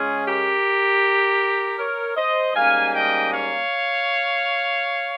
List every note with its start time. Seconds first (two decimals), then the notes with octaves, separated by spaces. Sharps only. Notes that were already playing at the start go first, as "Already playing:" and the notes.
Already playing: C#3 G#3 C#4 F4 G#4
0.27 G4 A#4
1.79 A#4 C#5
2.17 C5 D#5
2.55 G#2 G3 A#3 C#4 F5 G#5
2.93 D#5 G5
3.31 C#5 F5